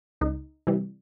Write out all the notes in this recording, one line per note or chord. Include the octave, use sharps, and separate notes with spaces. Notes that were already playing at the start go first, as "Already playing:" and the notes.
C#2 D#4
C3 E3 G3